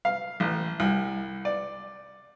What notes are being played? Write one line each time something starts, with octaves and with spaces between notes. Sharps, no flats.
F5
A1
C2
D5